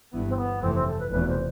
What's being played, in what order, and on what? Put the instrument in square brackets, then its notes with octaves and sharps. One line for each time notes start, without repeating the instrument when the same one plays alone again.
[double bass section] G1 G2 E3 B3
[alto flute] C4
B3
[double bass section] F1 F2 E3 A3 [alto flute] C4
[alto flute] C4
A4
B4
[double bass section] F1 E2 B2 [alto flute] B4
[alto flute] C5